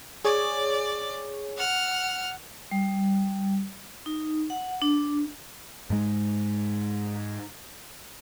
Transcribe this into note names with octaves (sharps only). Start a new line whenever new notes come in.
G#4 C#5 D5
F#5 F6
G3
D#4
F#5
D4
G#2 G#3